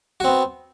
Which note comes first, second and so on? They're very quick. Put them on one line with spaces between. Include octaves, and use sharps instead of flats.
F#4 C4 B3